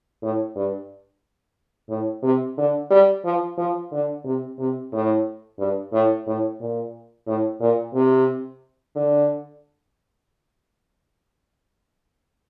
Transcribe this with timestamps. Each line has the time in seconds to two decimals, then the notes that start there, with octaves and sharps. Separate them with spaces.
0.22 A2
0.56 G2
1.90 A2
2.23 C3
2.58 D3
2.91 G3
3.25 F3
3.58 F3
3.92 D3
4.25 C3
4.59 C3
4.93 A2
5.59 G2
5.93 A2
6.27 A2
6.60 A#2
7.27 A2
7.60 A#2
7.95 C3
8.95 D3